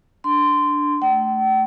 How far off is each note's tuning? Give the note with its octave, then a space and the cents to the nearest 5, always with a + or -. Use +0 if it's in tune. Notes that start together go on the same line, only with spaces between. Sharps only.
D4 +0 C6 -15
A3 +0 G5 -45